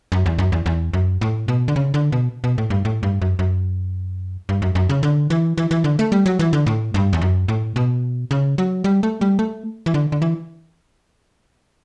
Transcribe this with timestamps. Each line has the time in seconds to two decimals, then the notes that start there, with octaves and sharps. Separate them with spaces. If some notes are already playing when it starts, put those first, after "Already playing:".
0.12 F#2
0.26 E2
0.39 F#2
0.52 E2
0.66 E2
0.93 F#2
1.21 A2
1.48 B2
1.68 D3
1.76 C#3
1.94 D3
2.12 B2
2.44 B2
2.58 A2
2.70 G2
2.85 A2
3.03 G2
3.22 F#2
3.39 F#2
4.49 G2
4.62 F#2
4.75 F#2
4.89 C#3
5.03 D3
5.30 E3
5.58 E3
5.71 E3
5.84 D3
5.99 A3
6.12 G3
6.26 F#3
6.39 E3
6.53 D3
6.66 A2
6.94 G2
7.13 E2
7.21 F#2
7.48 A2
7.76 B2
8.31 C#3
8.58 F#3
8.84 G3
9.03 A3
9.21 G3
9.39 A3
9.86 E3
9.94 D3
10.12 D3
10.22 E3